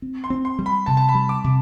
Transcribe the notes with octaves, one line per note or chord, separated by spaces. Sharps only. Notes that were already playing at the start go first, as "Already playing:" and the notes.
C4
C6
C4
C6
G3
B5
C3 A5
A5
B5
G3
D6
C3